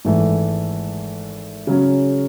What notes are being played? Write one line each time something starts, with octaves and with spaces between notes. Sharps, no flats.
G#1 G#2 E3 A3
C#3 F#3 C#4